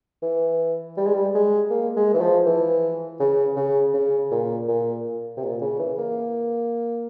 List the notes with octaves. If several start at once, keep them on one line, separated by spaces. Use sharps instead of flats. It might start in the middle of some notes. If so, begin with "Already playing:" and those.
E3
G3
G#3
G3
G#3
A#3
G#3
E3
F3
E3
C#3
C#3
C#3
A#2
A#2
C3
A#2
C#3
E3
A#3